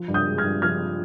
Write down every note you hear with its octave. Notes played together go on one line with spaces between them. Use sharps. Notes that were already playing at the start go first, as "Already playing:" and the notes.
Already playing: F3
G2
D#6 G6
G#3
F6 G#6
G2
F3 F6 G#6